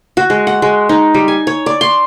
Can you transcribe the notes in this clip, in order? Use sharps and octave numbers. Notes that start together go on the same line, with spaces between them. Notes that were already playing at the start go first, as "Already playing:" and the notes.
F#4
G#3
F#5
G#3
D#4
G3
G#5
C#5
D5
C6